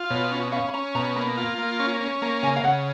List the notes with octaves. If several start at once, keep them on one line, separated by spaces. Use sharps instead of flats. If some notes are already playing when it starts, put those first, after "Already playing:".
Already playing: F4
B2 C#5
C#4
C#4 F5
B5
C#4 A#5
B2 A#5
A#3 B5
F4
A#3
C#4
C#4
A#3 A#5
C#3 G#5
F5
C#3 F#5